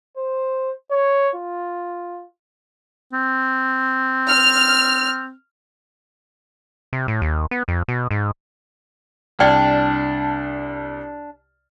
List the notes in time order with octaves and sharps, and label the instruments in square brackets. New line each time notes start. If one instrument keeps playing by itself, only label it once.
[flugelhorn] C5
C#5
F4
[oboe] C4
[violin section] F6
[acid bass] C3
A2
D#2
B3
F2
B2
G#2
[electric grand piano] C2 A5 F6 [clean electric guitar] D4 [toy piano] D5 G5